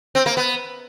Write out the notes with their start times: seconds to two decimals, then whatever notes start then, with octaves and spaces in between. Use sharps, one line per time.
0.15 C4
0.26 A#3
0.37 B3